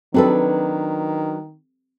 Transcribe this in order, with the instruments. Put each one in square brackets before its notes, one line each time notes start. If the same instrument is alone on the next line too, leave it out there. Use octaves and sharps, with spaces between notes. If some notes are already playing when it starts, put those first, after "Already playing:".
[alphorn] D#3 [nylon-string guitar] F#3 D4 B4 [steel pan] C4 A4